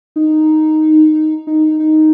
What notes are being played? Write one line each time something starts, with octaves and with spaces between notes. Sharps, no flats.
D#4
D#4
D#4